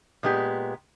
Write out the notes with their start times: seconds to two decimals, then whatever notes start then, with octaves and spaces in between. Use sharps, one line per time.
0.23 A#2 G#3 B3 G4